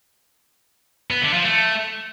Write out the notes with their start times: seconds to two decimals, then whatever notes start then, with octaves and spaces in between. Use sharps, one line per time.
1.10 B3
1.22 D3
1.33 F3
1.45 A3